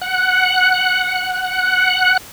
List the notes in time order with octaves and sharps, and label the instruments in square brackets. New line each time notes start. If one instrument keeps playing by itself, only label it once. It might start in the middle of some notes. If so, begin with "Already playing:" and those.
[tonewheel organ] F#5 F#6